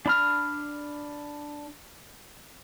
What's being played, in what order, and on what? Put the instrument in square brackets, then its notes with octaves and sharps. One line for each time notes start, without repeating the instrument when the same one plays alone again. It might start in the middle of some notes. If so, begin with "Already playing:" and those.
[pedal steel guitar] D4 B5 F6